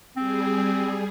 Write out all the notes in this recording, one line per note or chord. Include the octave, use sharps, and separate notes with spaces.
G3 C4 G#4